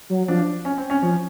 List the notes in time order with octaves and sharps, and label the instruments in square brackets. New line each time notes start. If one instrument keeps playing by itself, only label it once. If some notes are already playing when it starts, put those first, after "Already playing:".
[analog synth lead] F#3
[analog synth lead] F3 [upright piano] D4
[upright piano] C#4
C4
C#4
[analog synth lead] F3 [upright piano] C#4